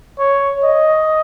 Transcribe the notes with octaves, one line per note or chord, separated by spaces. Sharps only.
C#5
D#5